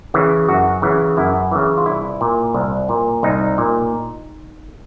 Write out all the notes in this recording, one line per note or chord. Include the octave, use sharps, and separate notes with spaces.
C#3 E3
F#2 F#4
C#3 E3
F#2 E4
C#3 E3
F4
C2 E4
A#2
C2
A#2
C2 D#4
A#2